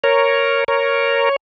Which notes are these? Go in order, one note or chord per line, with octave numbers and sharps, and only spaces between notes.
A#4 C#5
A#4 C#5